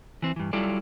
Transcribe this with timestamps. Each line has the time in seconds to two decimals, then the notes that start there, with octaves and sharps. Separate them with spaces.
0.22 E3 C4
0.36 G2 E3
0.53 F#3 G3 E4 F4 A4 D5